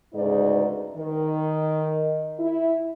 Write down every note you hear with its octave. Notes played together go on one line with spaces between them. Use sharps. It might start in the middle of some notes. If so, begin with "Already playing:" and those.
D2 G#2 C#3 D#4 B4 D5
D#3
E4